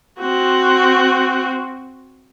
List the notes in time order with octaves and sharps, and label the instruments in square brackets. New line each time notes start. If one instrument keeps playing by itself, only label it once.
[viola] C4 F#4